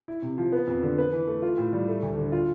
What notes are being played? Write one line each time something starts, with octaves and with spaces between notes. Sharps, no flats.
E4
C3
F3
B3
F2
D3
B4
E3
A3
F4
A2
G3
A3
D2
D3
F4